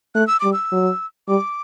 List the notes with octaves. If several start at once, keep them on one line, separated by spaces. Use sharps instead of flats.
A3 F#6
E6
G3 D6
E6
F#3
G3 D6